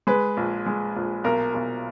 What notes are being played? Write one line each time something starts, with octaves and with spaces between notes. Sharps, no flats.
G#3 B4
A#1
G#3
A#1
B1 A#4
B1